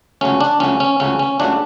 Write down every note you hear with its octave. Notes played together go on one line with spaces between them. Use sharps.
C#2 C#3 F#3 A3 C#4
D4
C#2 C#3 F#3 A3 C#4
C#4
C#2 C#3 F#3 A3 C#4
C#4
C#2 C#3 F#3 A3 D4